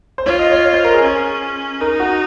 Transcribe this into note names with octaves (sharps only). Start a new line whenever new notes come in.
C5
F4 C#5
D#5
C#5
C#5
C5
A#4
G#4
C#4
D#4 A#4
F#4